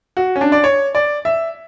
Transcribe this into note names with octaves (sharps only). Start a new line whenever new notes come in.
F#4
C#4
D4
D5
C#5
D5
E5